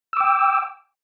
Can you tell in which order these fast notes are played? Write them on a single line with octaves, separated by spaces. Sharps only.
E6 D6 G5